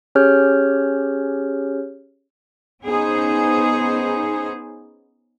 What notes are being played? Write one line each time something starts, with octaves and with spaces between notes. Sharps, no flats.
C#4 G4 G#4 C#5 F6 G6
B3 C#4 D#4 G#4 C5